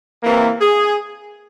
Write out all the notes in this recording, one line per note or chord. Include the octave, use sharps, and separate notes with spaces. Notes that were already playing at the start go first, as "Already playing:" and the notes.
C3 E3 A#3
G#4